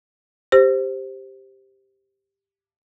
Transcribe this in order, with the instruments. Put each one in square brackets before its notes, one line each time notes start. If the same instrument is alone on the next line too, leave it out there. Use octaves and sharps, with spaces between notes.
[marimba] G4 C5